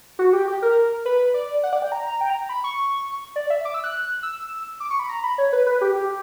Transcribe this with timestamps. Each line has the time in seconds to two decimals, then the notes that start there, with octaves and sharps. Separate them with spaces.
0.19 F#4
0.33 G4
0.48 G4
0.62 A#4
1.05 B4
1.34 D5
1.63 F#5
1.73 D5
1.82 G5
1.92 A#5
2.07 A#5
2.21 G5
2.30 A#5
2.49 B5
2.64 C#6
3.36 D5
3.50 E5
3.65 D6
3.74 E6
3.84 F#6
4.23 E6
4.80 D6
4.90 C#6
5.00 B5
5.09 A#5
5.23 B5
5.38 C#5
5.53 B4
5.67 B4
5.81 G4
5.96 G4